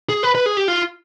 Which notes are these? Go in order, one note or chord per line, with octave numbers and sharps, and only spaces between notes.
G#4
B4
B4
G#4
G4
F4